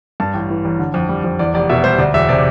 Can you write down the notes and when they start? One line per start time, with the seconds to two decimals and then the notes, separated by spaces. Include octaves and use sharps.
0.20 G2 A5
0.34 A1
0.50 E3
0.65 A1
0.79 D3
0.94 F2
1.09 G3
1.24 F2
1.39 E2 D5
1.54 F1 D5
1.69 B2 E5
1.84 G3 C5
1.99 D2 D5
2.14 E1 E5
2.29 C3 D5